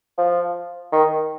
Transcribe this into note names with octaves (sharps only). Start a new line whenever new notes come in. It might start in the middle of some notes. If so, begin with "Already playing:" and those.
F3
D#3